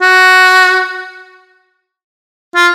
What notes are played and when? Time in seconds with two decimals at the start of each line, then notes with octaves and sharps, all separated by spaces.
0.02 F#4
2.56 F4